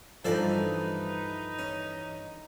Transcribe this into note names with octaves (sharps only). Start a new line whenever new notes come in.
G2 E3 F3 D#4 A4 B4 D5 D6
C#4